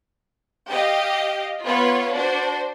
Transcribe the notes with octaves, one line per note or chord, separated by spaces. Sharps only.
G4 D#5 F5
B3 F4 B4 C#5
D4 F#4 C5